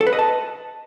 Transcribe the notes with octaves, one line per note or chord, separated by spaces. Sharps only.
A4
B4
D#5
A5